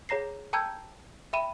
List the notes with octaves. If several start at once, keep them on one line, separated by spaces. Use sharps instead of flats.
G#4 C#5 A#5 A#6 C7
G5 A5 A#5 E6 G6 G#6
E5 G5 B5 D#7